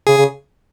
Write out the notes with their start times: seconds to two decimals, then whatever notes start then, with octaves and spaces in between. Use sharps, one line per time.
0.07 C#3 G#4
0.17 C#3